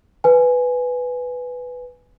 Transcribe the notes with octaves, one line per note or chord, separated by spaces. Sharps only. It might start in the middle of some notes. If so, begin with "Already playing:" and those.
B4 G#5